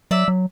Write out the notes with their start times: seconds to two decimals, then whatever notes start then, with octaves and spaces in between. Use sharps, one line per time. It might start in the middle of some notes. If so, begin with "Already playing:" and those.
0.11 F#3 D5 E5
0.28 F#3